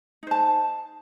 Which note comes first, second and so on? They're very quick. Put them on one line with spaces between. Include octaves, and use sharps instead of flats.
D#4 C5 A5